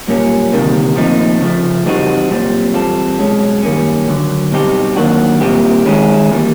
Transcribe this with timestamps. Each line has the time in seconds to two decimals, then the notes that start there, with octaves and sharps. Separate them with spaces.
0.07 B1 A#2 G3 A#3 C#4
0.52 D2 C3 D#3 G3 A#3
0.96 A#2 F3 A3 C4 D#4
1.41 C#3 F3 A3
1.86 E3 G3 C4 D#4 F#4
2.30 B1 A#2 G3 C4
2.74 E3 G3 C4 F4 A4
3.19 B1 B2 G#3 C#4
3.63 F#2 D#3 G3 A#3 C#4
4.08 D2 D3 F#3
4.52 B2 G3 C4 D#4 G4
4.96 D#3 F#3 A#3 D4 F#4
5.41 A#2 G3 C4 E4 G4
5.85 D#3 G#3 C#4 E4 G#4
6.31 E3 G3 A#3